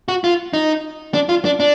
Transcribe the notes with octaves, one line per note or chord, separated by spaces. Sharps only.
F#4
F4
D#4
D4
F4
D4
D4